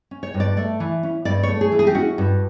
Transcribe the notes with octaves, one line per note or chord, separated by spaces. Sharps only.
C#4
C#5
G2
D5
A3 D5
E3
C#4
G2 D5
C#5
A3
G#4
E3
G#4
G4
C#4 F#4
G2